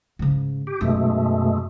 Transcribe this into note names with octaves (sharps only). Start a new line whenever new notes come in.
G#2 C#3
G4
F#2 B2 G#3 A3 D#4